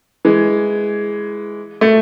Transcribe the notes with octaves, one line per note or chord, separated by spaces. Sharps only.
E3 G#3
A3